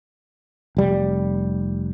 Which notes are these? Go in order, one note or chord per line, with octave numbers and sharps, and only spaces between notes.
F1 G3